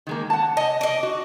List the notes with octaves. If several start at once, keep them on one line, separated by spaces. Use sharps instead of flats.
D#3 G#3 A#3
F#5 A5
D#5 G#5
D5 D#5
F#4